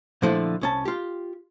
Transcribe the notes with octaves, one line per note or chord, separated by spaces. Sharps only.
A#2 D3 F3 A3 E4 F4
C2 C#4 A5
F4 G4